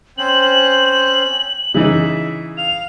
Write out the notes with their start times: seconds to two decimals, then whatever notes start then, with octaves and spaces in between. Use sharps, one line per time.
0.18 C4 C#4 C5 F#7
1.74 C#3 E3 D#4 E5
2.58 F5 F7